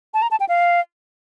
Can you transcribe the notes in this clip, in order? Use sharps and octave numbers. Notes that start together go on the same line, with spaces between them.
A5
A#5
A5
G5
F5